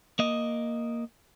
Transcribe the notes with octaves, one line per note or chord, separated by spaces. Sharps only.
A#3 D#5